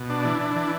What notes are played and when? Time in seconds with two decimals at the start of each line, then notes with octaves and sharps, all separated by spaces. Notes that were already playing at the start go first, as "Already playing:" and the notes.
Already playing: B2
0.10 D4
0.25 E3
0.41 D4
0.56 E3